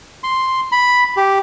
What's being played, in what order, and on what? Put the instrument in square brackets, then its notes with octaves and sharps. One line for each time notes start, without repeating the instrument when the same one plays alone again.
[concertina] C6
B5
G4